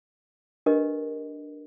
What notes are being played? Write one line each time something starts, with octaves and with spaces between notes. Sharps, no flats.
D4 G4 A#4 B4 D#5